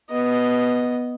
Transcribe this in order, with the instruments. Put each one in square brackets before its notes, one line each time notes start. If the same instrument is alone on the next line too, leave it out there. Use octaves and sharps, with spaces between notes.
[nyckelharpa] B3 D#5